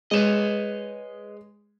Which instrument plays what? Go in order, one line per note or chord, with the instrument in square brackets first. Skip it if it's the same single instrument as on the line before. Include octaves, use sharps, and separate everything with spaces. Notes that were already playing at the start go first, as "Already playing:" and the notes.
[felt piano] G#3 E7 [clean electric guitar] B4 C#5 D#5